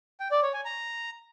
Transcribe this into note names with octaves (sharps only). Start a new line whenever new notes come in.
G5
D5
C#5
G#5
A#5